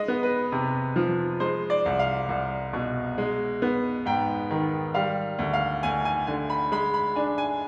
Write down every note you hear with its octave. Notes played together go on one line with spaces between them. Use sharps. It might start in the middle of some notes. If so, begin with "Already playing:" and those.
Already playing: G#3 D#5
B3
B4
C3
F3
G#3 C5
D5
C2
F5
C2
B2
G#3
B3
G#2 G5
D#3
G3 F5
D2
F5
D2 G#5
G#5
D3 G#5
B5
G#3 B5
B5
D4 G#5
G#5